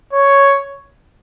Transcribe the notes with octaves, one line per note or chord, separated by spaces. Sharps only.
C#5